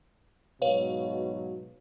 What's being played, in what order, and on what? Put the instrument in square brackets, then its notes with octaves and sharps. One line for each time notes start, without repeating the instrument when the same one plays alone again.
[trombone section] G#2 B2 F#3 [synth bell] B4 C#5 F5